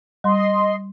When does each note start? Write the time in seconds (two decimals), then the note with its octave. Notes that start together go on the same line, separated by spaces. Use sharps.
0.24 G3 D#5 C6